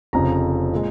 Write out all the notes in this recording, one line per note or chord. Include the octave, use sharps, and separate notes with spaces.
F1 F2 C#3 A#5
A#2 G#3